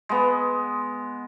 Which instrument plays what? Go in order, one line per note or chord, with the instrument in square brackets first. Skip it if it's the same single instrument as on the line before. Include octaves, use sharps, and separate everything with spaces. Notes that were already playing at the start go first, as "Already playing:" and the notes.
[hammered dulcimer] G#3 B3